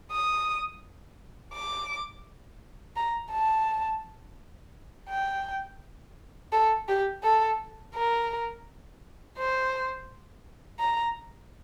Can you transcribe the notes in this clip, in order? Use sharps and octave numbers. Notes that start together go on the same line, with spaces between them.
D#6
D6
A#5
A5
G5
A4
G4
A4
A#4
C5
A#5